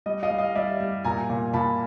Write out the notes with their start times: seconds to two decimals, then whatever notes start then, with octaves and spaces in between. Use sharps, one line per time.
0.06 G3 D#5
0.23 D#5 F5
0.31 G3
0.38 D#5 F5
0.55 G3 D5 E5
0.80 G3
1.04 A#2 G#5 A#5
1.30 A#2
1.54 A#2 A5 B5